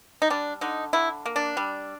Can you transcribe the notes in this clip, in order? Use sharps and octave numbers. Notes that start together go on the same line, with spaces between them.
D#4
G3 D4
D3 D#4
D3 E4
A#3
D4
G3